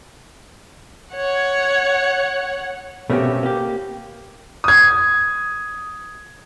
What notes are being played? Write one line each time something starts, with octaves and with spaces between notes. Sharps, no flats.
C#5 F#5
B2 A3 A#3 C4 C#4 G4
A#3 G4
D#6 G#6